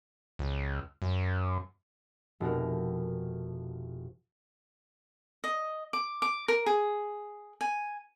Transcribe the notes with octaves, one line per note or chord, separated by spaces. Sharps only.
C#2
F#2
F1 B2 F#4 A#4
D#5
D6
D6
A#4
G#4
G#5